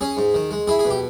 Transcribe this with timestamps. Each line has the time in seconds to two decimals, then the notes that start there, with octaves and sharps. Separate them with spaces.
0.01 C#4 G#4
0.17 G#2
0.35 D#3
0.51 G#3
0.67 E4 G#4
0.79 G#4
0.85 B2
0.90 G4